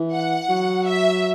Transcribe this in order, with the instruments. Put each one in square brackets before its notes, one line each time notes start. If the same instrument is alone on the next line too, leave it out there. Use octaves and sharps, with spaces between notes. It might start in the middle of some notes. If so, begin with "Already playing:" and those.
Already playing: [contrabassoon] E3
[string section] F#5
[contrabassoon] F#3
[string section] E5